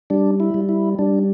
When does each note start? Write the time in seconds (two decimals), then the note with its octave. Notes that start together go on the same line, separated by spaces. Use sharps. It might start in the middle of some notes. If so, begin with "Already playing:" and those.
0.10 G3 D4
0.40 E4
0.54 G3
0.69 E4
0.99 G3 D4